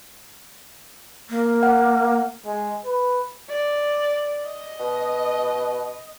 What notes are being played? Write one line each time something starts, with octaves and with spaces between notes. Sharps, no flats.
A#3
F#5
G#3
B4
D5
D#5
B2